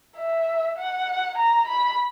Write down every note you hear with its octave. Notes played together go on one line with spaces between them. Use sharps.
E5
F#5
A#5
B5